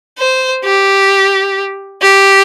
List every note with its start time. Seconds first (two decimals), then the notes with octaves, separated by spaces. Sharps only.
0.18 C5
0.64 G4
2.01 G4